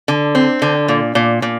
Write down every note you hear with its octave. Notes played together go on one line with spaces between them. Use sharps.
D3
C4
D3
A#2
A#2
A#2